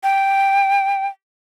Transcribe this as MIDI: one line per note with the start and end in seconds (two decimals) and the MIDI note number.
0.03 1.07 79